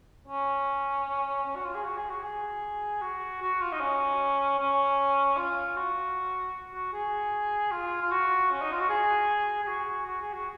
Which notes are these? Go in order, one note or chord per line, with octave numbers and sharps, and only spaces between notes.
C#4
C#4
F#4
F4
G#4
F#4
G#4
F#4
G#4
F#4
F#4
F4
D#4
C#4
C#4
F4
F#4
F#4
G#4
F4
F4
F#4
C#4
D#4
F4
F#4
G#4
G#4
F#4
F#4
G#4
F#4